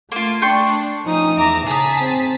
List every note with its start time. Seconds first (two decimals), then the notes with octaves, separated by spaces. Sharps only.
0.12 A3 A#3 F4
0.42 D4 G5 C6 C#6
1.05 F3 C#4 D#4 D#6
1.37 E2 E5 A#5 D6
1.67 C#3 G#4 A5 A#5 D#6 B6
2.00 C4